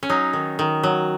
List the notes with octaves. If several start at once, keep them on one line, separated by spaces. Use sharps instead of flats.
C#4
F#3 D#4
D#3
D#3
F#3